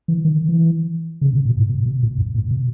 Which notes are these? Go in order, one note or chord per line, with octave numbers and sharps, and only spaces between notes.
E3
D#3
E3
C#3
B2
A#2
G#2
B2
B2
A#2
F#2
A#2
B2